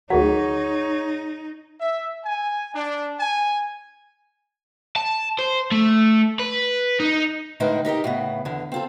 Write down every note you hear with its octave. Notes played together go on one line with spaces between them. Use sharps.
D2 D#3 F#3 D#4 G#4 C#5 F#5
E5
G#5
D4
G#5
A5
C5
A3
B4
D#4
A2 D3 G#3 D#4 A#4 B4
D#4 G4 A#4 D#5
A2 C#3 B3
E2 D3
C4 F4 A4